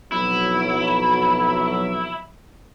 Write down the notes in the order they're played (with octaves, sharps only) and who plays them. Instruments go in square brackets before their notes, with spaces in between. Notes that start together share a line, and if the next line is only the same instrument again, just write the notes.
[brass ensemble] B1 F2 F#3 [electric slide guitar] E4